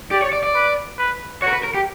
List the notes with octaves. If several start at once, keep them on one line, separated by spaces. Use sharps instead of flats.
G4 D5
C#5
D5
D5
B4
B4
F#4 C#5
A#4
B4
A#4
G4